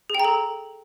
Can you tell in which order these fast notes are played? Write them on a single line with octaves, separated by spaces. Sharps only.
G#4 G5 A#5 A4